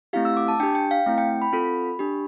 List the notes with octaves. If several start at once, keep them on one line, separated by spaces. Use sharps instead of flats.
A3 C4 E4 G4 F5
E6
D6
A5
D4 G4 G5
G5
F5
A3 C4 E4
G5
B5
C4 F4 A4
D4 G4